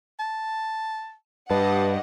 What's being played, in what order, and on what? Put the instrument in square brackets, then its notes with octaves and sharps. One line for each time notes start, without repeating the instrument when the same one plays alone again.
[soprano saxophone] A5
[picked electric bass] G2 [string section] G4 D#5 F#5 [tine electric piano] B4 [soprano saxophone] A5